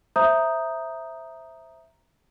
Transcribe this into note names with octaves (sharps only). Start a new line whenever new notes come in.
C5 E5 A#5 D#6 G6